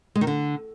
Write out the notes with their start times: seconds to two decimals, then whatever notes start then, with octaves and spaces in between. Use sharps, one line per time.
0.15 G#3
0.21 D#3
0.27 D3